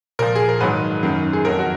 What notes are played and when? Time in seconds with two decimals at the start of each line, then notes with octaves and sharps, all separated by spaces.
0.19 A#2 F3 A#4
0.36 G#4
0.49 A#4
0.61 G#2 D#3 F#3 B4
1.03 F#2 D#3 F#3
1.33 G#4
1.45 F2 D#3 F#3 A#4
1.59 F#4